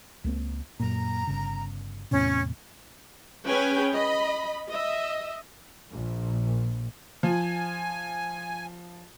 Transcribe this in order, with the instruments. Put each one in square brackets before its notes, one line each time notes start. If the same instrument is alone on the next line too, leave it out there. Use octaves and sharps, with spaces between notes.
[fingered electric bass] C#2 A#3 C4
[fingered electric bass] F#2 A#2 [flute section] A#5
[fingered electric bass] G1 C#3
[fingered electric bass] E2 A2 C3 [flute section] C#4
[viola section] C#4 G#4 B4 C#5 G5 G#5
D#5 B5
D#5 E5
[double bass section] A#1 A#2
[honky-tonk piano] F3 [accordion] G#5